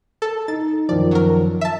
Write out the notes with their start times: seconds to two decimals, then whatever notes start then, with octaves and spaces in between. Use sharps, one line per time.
0.22 A4
0.48 D#4 A6
0.89 F#2 D#3 F3 D5
1.11 F#3 A#4
1.61 E5 A5